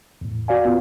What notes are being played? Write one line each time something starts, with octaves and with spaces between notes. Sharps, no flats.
E2 A2
F#4 D5 F5 G#5
B3 F4